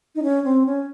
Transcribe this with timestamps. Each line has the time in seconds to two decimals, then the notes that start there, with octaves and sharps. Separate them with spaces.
0.15 D#4
0.23 C#4
0.44 C4
0.66 C#4